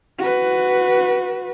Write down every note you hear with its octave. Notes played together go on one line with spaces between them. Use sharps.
F#4 B4